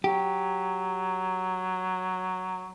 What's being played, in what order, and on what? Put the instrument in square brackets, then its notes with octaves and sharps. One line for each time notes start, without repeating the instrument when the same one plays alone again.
[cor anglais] F#3 [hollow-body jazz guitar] G4